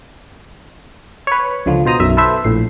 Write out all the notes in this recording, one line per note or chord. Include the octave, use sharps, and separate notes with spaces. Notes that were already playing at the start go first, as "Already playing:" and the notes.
B4 C#5
C#2 D3 F3
B2 C5 A#5 D#6
B1 F#2 E5
A4 B4 C5 E5
A#1 A2 C7